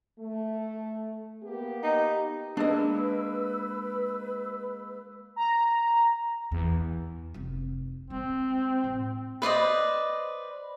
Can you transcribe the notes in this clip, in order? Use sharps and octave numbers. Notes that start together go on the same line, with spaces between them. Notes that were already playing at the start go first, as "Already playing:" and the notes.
A3
A#3 B3 G4
D#4
G#3 A#3 D4 B4 D#5 E6
A#5
E2
F1 D#4
G#3 C4
A2
B4 C5 D5 D#5